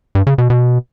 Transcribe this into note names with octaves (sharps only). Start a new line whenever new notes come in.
G2
C#3
B2
B2